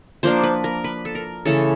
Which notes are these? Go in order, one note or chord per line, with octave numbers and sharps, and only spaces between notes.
F3 A#3 D4 C5
B4
A#4
B4
A4
A#4
C#3 E3 A3 A4